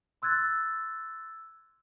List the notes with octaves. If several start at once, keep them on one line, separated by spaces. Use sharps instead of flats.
C6 E6 F#6 G#6 A6